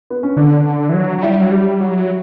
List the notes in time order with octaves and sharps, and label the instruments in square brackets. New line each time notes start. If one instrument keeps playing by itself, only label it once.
[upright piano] B3
C#4
[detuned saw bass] D3 [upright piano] D4
[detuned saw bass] D3
E3
F#3
F#3
[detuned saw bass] G3 [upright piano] E4
[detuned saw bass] F#3
G3
F#3